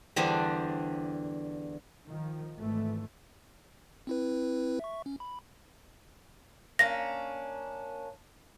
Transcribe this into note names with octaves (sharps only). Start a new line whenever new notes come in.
E2 D3 G3 D4 G4 C5
D#3 F3
G#1 G#2 E3 A3
C4 E4 B4
E5 C#6
C#4
B5
A#3 C#4 D4 A#6